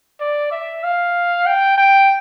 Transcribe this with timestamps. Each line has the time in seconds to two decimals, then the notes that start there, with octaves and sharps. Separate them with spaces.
0.20 D5
0.51 E5
0.83 F5
1.46 G5
1.78 G5